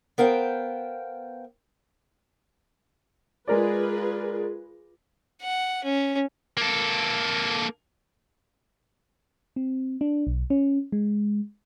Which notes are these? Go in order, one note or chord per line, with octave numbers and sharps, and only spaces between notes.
B3 A#4 C5 F5 G5
G#3 F4 G#4 A#4 B4 D5
F#5
C#4
A#3 A4
C4
D4
B1
C#4
G#3